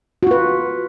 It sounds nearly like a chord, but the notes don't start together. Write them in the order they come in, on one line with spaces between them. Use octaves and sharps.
F#4 F4 B4